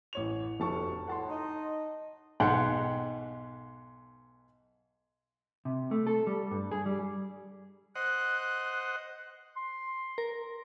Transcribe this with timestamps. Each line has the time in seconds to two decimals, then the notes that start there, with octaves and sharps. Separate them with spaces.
0.13 A1 C#5 F7
0.60 F1 D2 G2 A5 C#6
1.07 A2 F#5 A5 C6
1.28 D#4 D#5
2.40 B1 G#2 F#5 G5
5.65 C3
5.91 A3
6.07 A4
6.27 G3
6.51 G2
6.71 G#4
6.86 G3
7.95 C5 D#5 F#5 F#6
9.56 C6
10.18 A#4